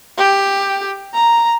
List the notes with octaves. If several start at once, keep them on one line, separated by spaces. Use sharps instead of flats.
G4
A#5